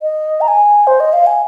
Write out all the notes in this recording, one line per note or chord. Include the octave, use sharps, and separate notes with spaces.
D#5
A#5
G#5
C5
D#5
F5
G#5